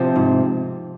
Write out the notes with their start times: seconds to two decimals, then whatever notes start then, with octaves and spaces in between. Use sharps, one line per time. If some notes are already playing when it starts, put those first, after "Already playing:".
Already playing: C3 F3
0.16 G#2